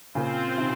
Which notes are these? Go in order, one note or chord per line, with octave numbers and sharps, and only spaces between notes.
A#2 C#3 C4 F4 C5
C3 D#3